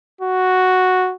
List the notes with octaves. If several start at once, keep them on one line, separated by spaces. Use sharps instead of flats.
F#4